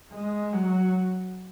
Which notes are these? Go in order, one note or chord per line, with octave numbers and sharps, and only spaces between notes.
G#3
F#3